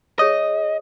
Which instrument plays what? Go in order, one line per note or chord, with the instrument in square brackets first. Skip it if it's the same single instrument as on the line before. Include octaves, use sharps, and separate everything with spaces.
[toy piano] G#4 C#5 D#6 [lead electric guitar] D#5